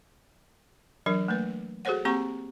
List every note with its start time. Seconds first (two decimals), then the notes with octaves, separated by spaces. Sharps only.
1.06 E3 F#3 D4 A#4
1.28 A3 A#3 B4
1.85 F#4 G#4 A4 C5 C#5 F#5
2.05 A#3 C4 G4 F#5 A#5 C#6